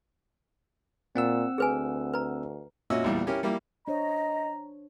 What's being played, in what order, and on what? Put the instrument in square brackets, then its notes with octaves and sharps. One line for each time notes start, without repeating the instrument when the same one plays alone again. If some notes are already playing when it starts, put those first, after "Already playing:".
[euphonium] A#2 [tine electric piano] C4 F#5 E6
[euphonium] D2 [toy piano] G#4 B4 G#5
[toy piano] B4 A#5
[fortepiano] A#2 C#4 F#4 D#5 E5 E6
A#1 E2 A#2 E3 G3
C#4 E4 G4 A#4
G3 A#3 E4 G4
[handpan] D4 C5 C#5 [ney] D#5 [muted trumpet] A#5